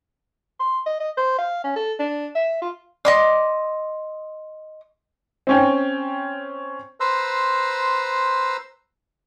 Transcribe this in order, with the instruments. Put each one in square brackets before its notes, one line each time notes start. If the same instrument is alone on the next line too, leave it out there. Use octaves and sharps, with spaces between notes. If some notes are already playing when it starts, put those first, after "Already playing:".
[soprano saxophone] C6
D#5
D#5
C5
F5
C#4
A4
D4
E5
F4
[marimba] D5 [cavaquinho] D#5 C6 D6
[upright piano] C4 C#4 G5
[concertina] B4 C5 A#5 C6 E6